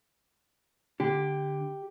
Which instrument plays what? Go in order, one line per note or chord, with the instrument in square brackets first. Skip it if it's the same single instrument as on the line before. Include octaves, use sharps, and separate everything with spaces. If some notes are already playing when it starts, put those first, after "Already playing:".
[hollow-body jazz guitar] D3 [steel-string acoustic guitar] G4